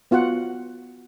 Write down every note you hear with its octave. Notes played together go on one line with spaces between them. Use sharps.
B3 F4 F#4 F#5